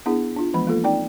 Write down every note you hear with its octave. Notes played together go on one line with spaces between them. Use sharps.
B3 D4 E4 G#4
D4 F4
E3 F3 G#3 B3 B5
A#3 F4 A4
C4 D#4 D5 G5